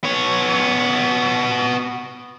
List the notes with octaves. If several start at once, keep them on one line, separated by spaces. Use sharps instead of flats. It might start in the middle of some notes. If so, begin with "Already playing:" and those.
B3 C#5